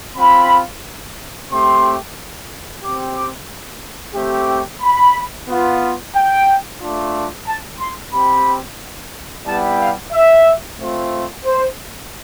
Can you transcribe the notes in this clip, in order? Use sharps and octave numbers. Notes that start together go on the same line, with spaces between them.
C4 F4 B5
A3 C4 G4 C6
C4 G4 D6
D6
A3 C4 G4
B5
B3 F4
G5
A3 D4 F4
A5
C6
C4 G4 B5
G3 B3 E4 G4 A5
F5
E5
A3 C4 F4
C5